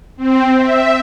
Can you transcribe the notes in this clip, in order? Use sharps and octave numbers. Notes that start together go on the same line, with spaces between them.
C4
E5